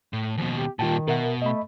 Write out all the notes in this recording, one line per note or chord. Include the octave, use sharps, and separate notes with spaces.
A2
D#2 B2 F3
G4
A#2 D#3 G3 F4 G5 A5
B2 A#4 E5 F#5
A3 D#5 B5